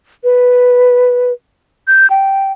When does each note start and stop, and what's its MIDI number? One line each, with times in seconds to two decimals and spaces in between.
0.24 1.32 71
1.87 2.09 91
2.10 2.52 79